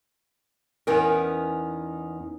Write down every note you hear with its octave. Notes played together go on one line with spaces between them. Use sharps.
E2 B3 C#4 D#4 A#4